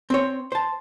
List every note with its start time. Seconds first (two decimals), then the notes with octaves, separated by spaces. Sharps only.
0.10 C4 C5 C#5
0.52 C5 A5